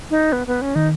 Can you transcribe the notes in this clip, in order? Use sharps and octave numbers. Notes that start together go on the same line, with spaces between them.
D#4
B3
B3
C#4
D#3 D#4